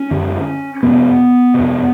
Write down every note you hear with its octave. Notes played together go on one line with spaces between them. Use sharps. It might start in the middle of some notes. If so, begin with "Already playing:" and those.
Already playing: C#4
F#2 D3
F2 C3 B3
F2 C3